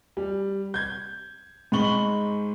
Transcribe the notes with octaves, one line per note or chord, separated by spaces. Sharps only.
G3
G6 G#6
G#2 G#3 B5 C#6 F#7 G7